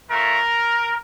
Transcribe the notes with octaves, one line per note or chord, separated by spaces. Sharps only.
A3 C#4 F4 A#4